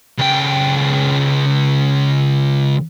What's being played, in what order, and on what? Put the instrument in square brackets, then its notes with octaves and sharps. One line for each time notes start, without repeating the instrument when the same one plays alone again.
[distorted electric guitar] C#2 G5